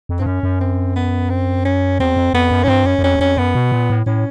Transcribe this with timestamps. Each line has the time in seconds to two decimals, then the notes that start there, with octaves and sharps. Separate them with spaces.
0.09 F2
0.18 G2 C4
0.26 F#2 C#4
0.43 F#2
0.60 C4
0.96 B3
1.30 C4
1.65 C#4
2.00 E2 C4
2.17 F2
2.34 F2 B3
2.51 F#2
2.63 G#2 C#4
2.68 G2 C4
2.85 F#2 C#4
2.99 F#2
3.03 F2 C#4
3.16 E2
3.20 F2 C#4
3.37 F#2 B3
3.55 B2
3.72 A#2
3.90 A2
4.06 A2 C#4